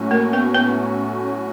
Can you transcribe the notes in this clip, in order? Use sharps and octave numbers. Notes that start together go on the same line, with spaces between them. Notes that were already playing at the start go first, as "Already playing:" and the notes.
Already playing: A2 F#3 A3 C#4 F#4
A#3 A#4
B3 B4
B3 B4